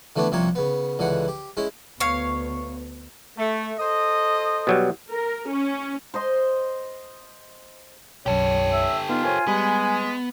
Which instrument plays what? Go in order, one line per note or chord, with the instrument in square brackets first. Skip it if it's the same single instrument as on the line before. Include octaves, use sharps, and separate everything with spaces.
[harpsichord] D3 E3 A3 B3 D4
C2 C3 F3 A#3 C#5
C#3 B3
C#2 D3 E3 F#5
G4
G#3 C#4 E4
[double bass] D2 B3 [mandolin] C#5 F5
[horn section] A3
A4 C5 D#5
[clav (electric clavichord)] B2 F#3 G3
[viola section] A#4
C#4
[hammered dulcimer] C5 D#5 C6
[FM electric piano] B1 F#2 [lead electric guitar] G4 A4 [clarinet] C#5
[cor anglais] E5
[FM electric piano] B3 D#4 [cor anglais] F4
[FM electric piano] A#4 C5 C#5 [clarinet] G#5
[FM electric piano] G3 [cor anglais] G#3 [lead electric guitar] B3